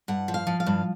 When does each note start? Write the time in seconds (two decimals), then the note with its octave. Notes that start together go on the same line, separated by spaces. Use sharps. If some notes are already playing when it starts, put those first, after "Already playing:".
0.08 G2 F#5
0.28 F3
0.34 F5
0.47 F3
0.60 F5
0.66 G2